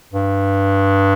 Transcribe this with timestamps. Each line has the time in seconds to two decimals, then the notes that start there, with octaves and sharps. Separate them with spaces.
0.13 G2